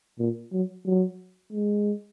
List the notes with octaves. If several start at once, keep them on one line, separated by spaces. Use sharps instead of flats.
A#2
F#3
F#3
G#3